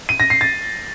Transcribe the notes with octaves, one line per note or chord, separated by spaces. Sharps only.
D#7
A#6
C7
A6